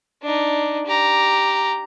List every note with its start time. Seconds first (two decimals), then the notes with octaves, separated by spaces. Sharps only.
0.23 D4 D#4
0.86 G4 A#5